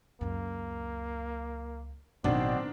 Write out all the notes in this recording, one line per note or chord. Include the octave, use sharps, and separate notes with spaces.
C#2 F#2 A#3
A1 B2 D#3 F#3 C4 D4 D5